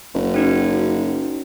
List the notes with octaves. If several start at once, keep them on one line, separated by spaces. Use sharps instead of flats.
F#1
C#4 D#4 F#4